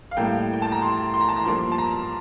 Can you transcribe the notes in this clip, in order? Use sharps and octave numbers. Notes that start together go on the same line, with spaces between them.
F5
A2 G3 A#3 G5
G5
A5
A#5
C6
C6
A#5
A5
A#5
G2 F3 A#3 D4 C6
A5
A#5